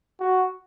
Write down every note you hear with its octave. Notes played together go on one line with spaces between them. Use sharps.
F#4